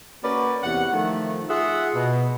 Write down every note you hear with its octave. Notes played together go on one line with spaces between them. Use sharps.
A#3 C#4 F#4 B4 D5
E2 C3 F#5
D#3 F3 A3
F4 G#4 E5 F#5
B2